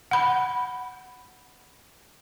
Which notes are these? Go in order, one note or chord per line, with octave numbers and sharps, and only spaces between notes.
F#5 B5